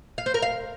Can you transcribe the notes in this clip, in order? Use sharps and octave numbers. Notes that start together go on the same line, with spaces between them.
F5
C5
A#4
F5